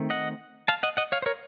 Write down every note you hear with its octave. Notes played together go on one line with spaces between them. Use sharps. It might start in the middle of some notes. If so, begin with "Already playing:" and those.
Already playing: D#3 A3 C4
D#5 F#5
F5 A5
D#5 F#5
D#5 F#5
C#5 F5
C5
A#4 C#5